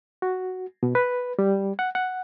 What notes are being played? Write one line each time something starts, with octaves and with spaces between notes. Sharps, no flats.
F#4
B2
B4
G3
F#5
F#5